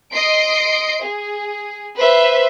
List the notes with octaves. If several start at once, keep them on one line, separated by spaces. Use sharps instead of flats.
D#5 C6 C7 D7
G#4
B4 C5 E5